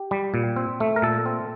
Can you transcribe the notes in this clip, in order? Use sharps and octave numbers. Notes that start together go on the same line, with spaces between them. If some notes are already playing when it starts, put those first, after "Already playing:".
Already playing: G4
G3
A#2
C4
A3
A#4
A#2 A4
C4